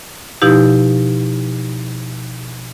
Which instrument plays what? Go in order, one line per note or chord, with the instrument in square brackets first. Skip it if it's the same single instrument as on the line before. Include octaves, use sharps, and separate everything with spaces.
[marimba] B2 F3 D#4 E4 G4